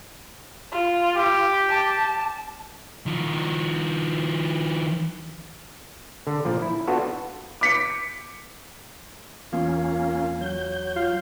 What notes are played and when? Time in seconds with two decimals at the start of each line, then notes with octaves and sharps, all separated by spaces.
0.71 F4
1.17 G4
1.69 A5
3.06 D#3 F3
6.27 D3
6.45 A#2 F3
6.62 E4
6.87 B3 D4 F4 F#4 A4
7.61 D6 B6 C#7
9.53 E2 A#3 C#4 F4
10.41 F#3 G6
10.96 F4